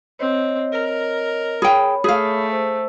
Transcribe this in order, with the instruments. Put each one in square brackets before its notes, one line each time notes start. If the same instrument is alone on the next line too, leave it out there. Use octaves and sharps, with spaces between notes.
[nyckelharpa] C4 [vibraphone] C#5 D#5
[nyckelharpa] A#4
[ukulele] G#4 G5 [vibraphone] C#5 B5
[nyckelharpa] A3 [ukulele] G#4 F5
[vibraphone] C5 E6